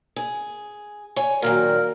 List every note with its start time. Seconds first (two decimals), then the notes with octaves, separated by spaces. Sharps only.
0.16 G#4
1.16 C#5 G#5
1.42 A#2 D#3 F#3 A#4